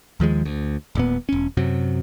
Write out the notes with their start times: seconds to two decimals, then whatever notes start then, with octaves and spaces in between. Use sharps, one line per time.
0.20 D#2 D#3 F3 G#3
0.45 D2
0.95 D#1 A#2 B3
1.29 E1 C#4
1.57 F#2 C3 F#3